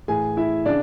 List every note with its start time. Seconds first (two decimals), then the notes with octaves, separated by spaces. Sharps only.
0.08 A2 E3 G#4 G#5
0.37 E4 E5
0.66 C#3 D4 D5